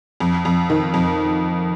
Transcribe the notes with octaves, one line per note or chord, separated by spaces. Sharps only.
F2
F2
D#3
F2